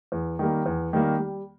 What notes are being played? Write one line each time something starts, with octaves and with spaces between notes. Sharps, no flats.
E2
D#3 G3 A#3
E2
D#3 G3 A#3
G3